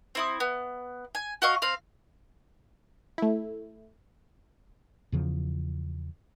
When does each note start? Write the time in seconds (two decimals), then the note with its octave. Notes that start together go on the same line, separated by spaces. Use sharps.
0.15 C4 E4 D#6
0.40 B3
1.15 G#5
1.42 F#4 D#5 F5 C#6
1.62 C4 F5 F6
3.18 A3 E4
5.12 E2 C#3 F3